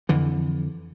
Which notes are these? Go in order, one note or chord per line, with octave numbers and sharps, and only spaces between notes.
F2 D3 E3